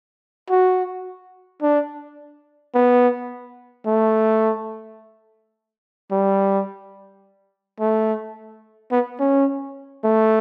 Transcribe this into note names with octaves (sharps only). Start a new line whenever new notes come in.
F#4
D4
B3
A3
G3
A3
B3
C#4
A3